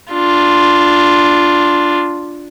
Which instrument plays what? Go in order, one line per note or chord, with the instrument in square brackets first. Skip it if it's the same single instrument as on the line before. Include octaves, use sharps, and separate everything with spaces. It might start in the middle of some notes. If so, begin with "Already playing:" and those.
[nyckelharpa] D4 F4